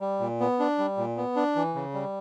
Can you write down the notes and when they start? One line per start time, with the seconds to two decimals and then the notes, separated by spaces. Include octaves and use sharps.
0.01 G3
0.20 A#2
0.40 B3
0.60 D4
0.78 G3
0.97 A#2
1.17 B3
1.36 D4
1.56 E3
1.75 C#3
1.94 G3